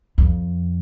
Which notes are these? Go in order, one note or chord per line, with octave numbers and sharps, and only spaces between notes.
F2